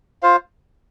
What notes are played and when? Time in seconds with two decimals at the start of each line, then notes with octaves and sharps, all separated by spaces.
0.23 F4 C5 F5